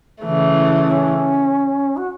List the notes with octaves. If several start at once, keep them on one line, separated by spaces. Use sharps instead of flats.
C#3 E3 A3 E4
C#4
F#4